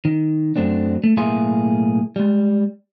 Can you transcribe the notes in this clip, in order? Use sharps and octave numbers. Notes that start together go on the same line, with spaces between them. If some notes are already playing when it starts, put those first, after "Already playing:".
D#3
F#2 F#3 A3 C4 D4
A3
B1 A2 A#3 G#4 E5 C6
G3 G#3